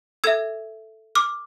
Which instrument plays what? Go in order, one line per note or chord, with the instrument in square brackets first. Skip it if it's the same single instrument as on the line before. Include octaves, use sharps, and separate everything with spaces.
[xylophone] A4 E5 E6 G#6
D6 F6